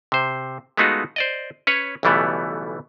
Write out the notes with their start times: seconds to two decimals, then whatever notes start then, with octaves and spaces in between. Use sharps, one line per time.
0.12 C3 C5
0.77 G#3 A3 B3 D#4 F4 F#4
1.16 C5 D5 D#5
1.67 C#4 B4 C#5
2.03 B1 C#3 E3 G3 A3 B3